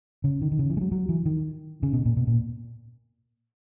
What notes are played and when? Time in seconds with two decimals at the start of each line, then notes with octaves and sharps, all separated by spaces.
0.24 C#3
0.42 D#3
0.52 D#3
0.59 C#3
0.70 E3
0.77 G#3
0.81 F#3
0.92 F#3
1.09 E3
1.25 D#3
1.83 C#3
1.93 B2
2.05 A#2
2.17 B2
2.27 A#2